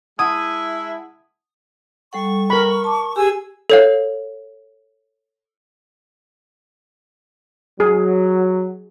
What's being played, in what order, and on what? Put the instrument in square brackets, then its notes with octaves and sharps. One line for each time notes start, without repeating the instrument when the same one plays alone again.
[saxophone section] G#3 E4 [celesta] F#5 A5 G#6 [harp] D#6
[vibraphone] G3 A4 F#5 [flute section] C#6
[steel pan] A#4 B5
[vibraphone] A5 D6
[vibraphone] G4 [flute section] G#4 G#5 E6
[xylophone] A4 C#5 F5
[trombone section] F#3 [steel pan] G#4